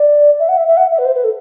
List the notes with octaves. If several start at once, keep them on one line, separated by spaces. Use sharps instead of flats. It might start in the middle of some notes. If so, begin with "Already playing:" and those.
Already playing: D5
E5
F#5
E5
E5
F#5
E5
B4
C5
B4
A4